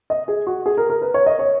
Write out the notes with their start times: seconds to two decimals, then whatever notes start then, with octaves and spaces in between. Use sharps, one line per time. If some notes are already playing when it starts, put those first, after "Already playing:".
0.10 D#5
0.28 G#4
0.47 F#4
0.66 G#4
0.77 A#4
0.90 A#4
1.02 B4
1.14 C#5
1.26 D#5
1.39 C#5